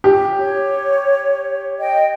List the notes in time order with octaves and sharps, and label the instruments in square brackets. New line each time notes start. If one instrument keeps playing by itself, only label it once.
[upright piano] G4
[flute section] C#5
D#5 G5